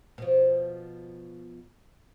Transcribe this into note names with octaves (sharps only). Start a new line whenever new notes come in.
B2 F3